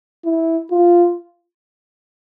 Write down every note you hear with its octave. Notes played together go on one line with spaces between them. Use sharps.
E4
F4